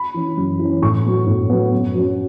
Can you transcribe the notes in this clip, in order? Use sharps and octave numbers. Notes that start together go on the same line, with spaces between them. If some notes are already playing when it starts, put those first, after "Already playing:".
Already playing: B5
E3 C#4
F#2
E3 C#4
A2 C#6
F#3 B3
A2
F#3 B3
F#2
F#3 C#4